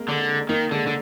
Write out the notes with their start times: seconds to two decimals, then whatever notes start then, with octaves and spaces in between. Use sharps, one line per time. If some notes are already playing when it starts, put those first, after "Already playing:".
Already playing: G#3 A#3 C4
0.09 D3
0.49 D#3 A#3
0.71 D3 G#3
0.87 D3